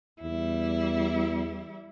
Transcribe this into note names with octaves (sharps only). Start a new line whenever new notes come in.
E2 G3 E4